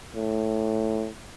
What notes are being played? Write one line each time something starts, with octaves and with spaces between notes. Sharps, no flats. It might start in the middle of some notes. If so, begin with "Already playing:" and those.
A2